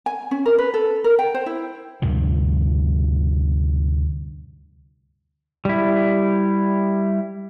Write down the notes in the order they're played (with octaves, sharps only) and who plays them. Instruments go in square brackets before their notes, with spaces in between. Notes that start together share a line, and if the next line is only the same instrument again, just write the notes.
[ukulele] G#5
C#4
A#4
B4
A4
A#4
G5
C5
E4
[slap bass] D2 G2 C3 F3
[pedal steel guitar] G3 E4